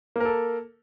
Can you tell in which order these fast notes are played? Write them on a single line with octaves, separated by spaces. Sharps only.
A#3 A#4 A4